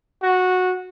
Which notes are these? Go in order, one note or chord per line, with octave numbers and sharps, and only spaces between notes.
F#4